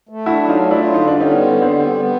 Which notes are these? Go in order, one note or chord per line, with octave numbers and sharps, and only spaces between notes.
A3
D4 E4 F#4
F#3
D#4 F4
A3
D4 E4
F4
D3 D#4
G3 D4
C#4 D#4
B3
D3
G3 C4 D4
B3
B3